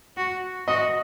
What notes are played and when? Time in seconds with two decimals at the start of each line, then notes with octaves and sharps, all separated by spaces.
0.17 F#4
0.68 F#4 D#5